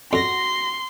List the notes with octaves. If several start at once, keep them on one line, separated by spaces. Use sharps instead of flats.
F2 F#4 C6 A#6